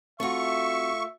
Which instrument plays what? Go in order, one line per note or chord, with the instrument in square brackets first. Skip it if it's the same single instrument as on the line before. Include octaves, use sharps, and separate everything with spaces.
[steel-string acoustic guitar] A3 F4 [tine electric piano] C4 F#4 [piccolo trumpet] E5 [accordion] C#6